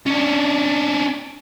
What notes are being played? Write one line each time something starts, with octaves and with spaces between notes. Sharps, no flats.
C#4 D4